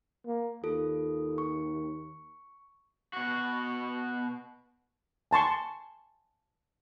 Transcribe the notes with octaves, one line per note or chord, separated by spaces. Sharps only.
A#3
D#2 F4 A4
C#6
B2 F#4
G#5 A5 C6 C#6